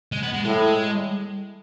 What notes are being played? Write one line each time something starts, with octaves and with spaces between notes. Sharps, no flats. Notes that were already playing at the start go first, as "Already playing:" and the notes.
G#3
B3
G#3
A2 G#3